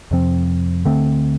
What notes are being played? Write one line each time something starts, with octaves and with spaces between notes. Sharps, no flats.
F2 C3 F3 C4
D2 D3 A3 C4